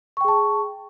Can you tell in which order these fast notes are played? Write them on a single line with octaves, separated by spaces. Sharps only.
C#6 G5 G#4 A5